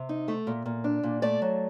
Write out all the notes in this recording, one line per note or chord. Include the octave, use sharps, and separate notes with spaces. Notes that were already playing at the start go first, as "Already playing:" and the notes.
Already playing: C3
D#4
A3
A#2
A#2
D4
A#2
A3 D5
F#3